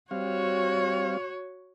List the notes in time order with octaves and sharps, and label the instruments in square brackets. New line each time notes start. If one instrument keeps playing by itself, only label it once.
[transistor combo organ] G3 C4 F5 [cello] F#4 C#5